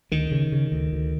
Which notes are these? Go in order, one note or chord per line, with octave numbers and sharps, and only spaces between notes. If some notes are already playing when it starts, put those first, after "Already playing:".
D2 D#3
C#3
C#3
D2
D2